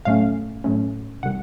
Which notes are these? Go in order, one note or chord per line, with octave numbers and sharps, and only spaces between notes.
A2 F#3 A3 C#4 F5
A2 F#3 A3 C#4
C3 D#3 G3 F#5